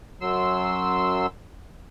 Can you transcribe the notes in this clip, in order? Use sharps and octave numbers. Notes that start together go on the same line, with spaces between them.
F#2 F#3 C6 E6